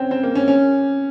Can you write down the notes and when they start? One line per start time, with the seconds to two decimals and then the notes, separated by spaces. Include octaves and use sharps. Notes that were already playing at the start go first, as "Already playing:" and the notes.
Already playing: C4 C#4
0.11 C4
0.23 A#3
0.35 C#4
0.48 C#4